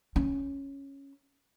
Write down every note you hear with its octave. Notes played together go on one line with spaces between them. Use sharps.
C#4